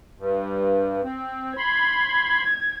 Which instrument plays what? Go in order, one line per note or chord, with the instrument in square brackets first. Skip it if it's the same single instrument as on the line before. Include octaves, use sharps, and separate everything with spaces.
[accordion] G2
C4
[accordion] B5 C6 [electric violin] G#6